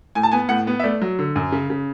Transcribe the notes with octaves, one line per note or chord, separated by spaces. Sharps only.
A2 G#5
A5
B3 G#5
A2 F#5
B3
E5
A3 D5
F#3
D3
F#2
C#3
C#3